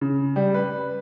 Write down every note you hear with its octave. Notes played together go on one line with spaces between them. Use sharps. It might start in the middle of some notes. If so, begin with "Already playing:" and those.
C#3
G3
B4